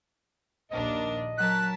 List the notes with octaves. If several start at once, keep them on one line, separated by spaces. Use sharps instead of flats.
A#1 D#2 D4 A#4 D#5
F#3 A#4 A5 F#6 B6